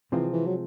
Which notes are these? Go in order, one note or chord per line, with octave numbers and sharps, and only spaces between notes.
C3 E3 F3 G#3 C4 F4
E3
F#3